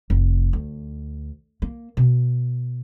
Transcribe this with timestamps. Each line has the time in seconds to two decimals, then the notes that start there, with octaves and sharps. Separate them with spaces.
0.10 F1
0.53 D2
1.62 A#3
1.97 B2